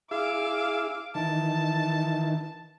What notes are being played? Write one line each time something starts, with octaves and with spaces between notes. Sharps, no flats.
E4 G#4 F5 D6 E6
D#3 E3 A5